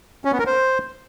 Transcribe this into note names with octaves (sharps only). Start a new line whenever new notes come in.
C#4
B3
A#4
C5